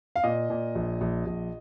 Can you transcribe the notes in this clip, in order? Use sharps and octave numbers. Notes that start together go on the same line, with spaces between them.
F5
A#2 D#5
A#2
A#1
A#1
A#1